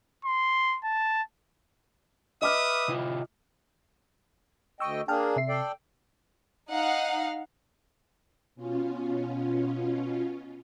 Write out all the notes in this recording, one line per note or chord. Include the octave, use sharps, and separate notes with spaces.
C6
A5
B4 D#5 E5 D6 D#6 F6
C3 E4 F4
D2 D#5 G5 C#6 E6
A#3 D4 G#4 G5 A5 F6
C3 E5 C7
A4 D5 G5
D#4 F5 F#5
B2 C#4 F4